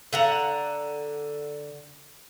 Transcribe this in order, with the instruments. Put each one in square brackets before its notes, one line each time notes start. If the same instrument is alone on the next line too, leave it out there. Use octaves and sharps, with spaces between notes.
[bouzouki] D3 F#5 A#5